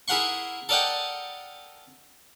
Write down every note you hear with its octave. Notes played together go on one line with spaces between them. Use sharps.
E4 G#4 A#4 F#5 C6 C#6
A4 A#4 D5 D#5 F#5 G5